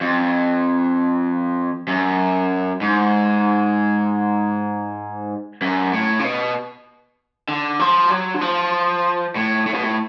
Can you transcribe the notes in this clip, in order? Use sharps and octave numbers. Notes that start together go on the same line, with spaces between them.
F2
F#2
G#2
F#2
A2
C#3
B2
D3
F3
F#3
D3
F3
A2
A2
B2
A2